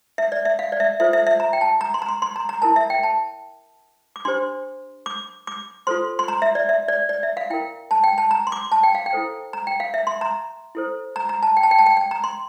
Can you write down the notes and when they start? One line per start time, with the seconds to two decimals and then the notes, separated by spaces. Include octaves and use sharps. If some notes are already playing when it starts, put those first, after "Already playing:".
0.18 E5
0.32 D5
0.45 E5
0.59 F5
0.72 D5
0.80 E5
1.00 F4 A4 C5 E5
1.13 E5
1.27 E5
1.40 A#5
1.53 G5
1.61 A5
1.81 A#5
1.94 C6
2.02 A#5
2.09 C6
2.22 C6
2.36 A#5
2.49 A#5
2.62 E4 A#4 A5
2.76 E5
2.90 G5
3.03 A5
4.16 D6
4.25 D4 G4 C5 C6
5.06 D6
5.47 D6
5.87 F4 A4 C5 C6
6.19 C6
6.28 A#5
6.42 E5
6.55 D5
6.69 E5
6.88 D5
7.09 D5
7.23 E5
7.37 F5
7.50 E4 A#4 G5
7.91 A5
8.04 G5
8.18 A5
8.31 A#5
8.47 C6
8.52 D6
8.72 A5
8.83 G5
8.95 F5
9.06 G5
9.13 E4 A4 C5
9.53 A#5
9.67 G5
9.80 F5
9.94 E5
10.07 C6
10.21 A#5
10.75 E4 A4 C5
11.16 A#5
11.29 A#5
11.43 A5
11.57 G5
11.63 A5
11.71 G5
11.79 A5
11.86 G5
11.97 G5
12.11 A#5
12.24 C6